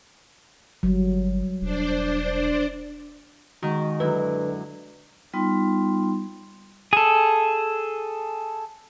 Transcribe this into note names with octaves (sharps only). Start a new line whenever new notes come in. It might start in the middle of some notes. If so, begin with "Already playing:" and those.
G1 F#3 G3
E1 D4 C5 D5
D#3 G#3 F#4
F#2 D3 E4 B4
G3 B3 D#4 F4 C6
G#4 A4